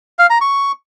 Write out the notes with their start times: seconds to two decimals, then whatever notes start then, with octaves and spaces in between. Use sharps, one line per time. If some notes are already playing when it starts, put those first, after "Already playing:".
0.19 F5
0.30 A#5
0.41 C#6